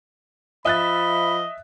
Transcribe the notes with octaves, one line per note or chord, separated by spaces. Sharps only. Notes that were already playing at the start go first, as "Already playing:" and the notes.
F3 D#5 E5 B5 F#6 A6